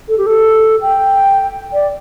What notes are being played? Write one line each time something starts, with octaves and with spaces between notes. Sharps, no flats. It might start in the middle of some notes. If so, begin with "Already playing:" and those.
A4
G4
A4
G5
D5